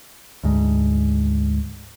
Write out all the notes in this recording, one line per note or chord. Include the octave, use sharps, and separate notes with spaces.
D2 G#2